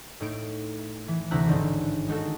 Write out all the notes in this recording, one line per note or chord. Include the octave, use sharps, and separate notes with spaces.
A2 D#4 D7
E3
D2 C3 E4 A#5 F#6
A1 G#2 D3 D#3
G#3 D#4 F#4 A4